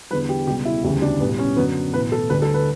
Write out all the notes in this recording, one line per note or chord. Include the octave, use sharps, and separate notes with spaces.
E2 D3 G3 B4
G4
C#2 B2 G3 G4
E4
E1 D2 C#3 E3 G3 E4
D4
B1 A2 G3 B3
C#4
F#2 D3 F#3 B3
B1 A2 E3 B4
A4
D2 D3 G3 B4
A4
B4